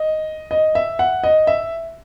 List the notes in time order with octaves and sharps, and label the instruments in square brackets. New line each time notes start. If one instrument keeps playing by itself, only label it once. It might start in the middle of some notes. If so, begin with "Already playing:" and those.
Already playing: [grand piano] D#5
D#5
E5
F#5
D#5
E5